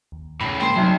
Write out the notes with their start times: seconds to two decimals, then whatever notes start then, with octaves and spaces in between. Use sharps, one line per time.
0.12 D#2
0.41 A2 C#3 B5
0.60 D3 G#3 A#3 C5 G5 C6
0.76 C2 F#3 D#4 E5 A5